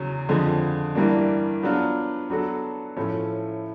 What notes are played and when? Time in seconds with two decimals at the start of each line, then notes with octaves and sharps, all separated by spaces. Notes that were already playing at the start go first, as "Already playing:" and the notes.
Already playing: E2 C#3 F#3
0.29 F2 D3 F3 G#3
0.95 G2 E3 G3 A#3 D4
1.63 F#3 B3 D4 F4
2.30 F#3 B3 D4 F#4 A4
2.97 A2 F3 A3 C#4